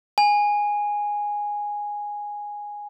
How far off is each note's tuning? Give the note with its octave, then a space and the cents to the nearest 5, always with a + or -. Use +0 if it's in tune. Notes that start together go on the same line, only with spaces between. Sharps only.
G#5 -5